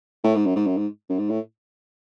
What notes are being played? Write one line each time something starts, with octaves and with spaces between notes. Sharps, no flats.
A2
G#2
F#2
G#2
F#2
G#2
F#2
G#2
A2